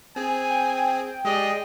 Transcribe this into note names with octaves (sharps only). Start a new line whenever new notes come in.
C4 G#4 G#5
G5
G#3 G4 G#4 D5 D#5